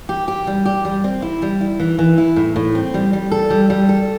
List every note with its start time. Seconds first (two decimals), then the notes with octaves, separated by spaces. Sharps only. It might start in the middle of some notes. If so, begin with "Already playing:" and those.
0.09 G4
0.28 G4
0.47 G3
0.66 G4
0.85 G3
1.04 C4
1.22 E4
1.42 G3
1.61 E4
1.80 E3
1.99 E3
2.18 E4
2.36 A2
2.56 A2
2.75 C4
2.94 G3
3.13 G3
3.31 A4
3.50 G3
3.70 G3
3.89 A4